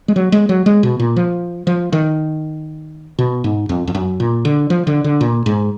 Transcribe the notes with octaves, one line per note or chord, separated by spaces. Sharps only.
G#3
F#3
G#3
F#3
G#3
B2
A#2
F3
F3
D#3
B2
G#2
F2
F2
F#2
A#2
D3
F3
D3
D3
A#2
G#2